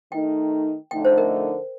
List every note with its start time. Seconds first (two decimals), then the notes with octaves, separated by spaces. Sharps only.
0.12 D#3 A3 D#4 G5
0.91 F2 D3 A3 D#4 G5
1.05 C5
1.18 A#4